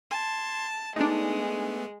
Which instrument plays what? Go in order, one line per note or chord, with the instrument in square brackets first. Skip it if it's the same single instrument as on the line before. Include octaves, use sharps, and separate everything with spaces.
[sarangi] A5 [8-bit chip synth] C6 G#6
[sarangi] G#3 [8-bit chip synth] A3 B3 [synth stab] D4 D#4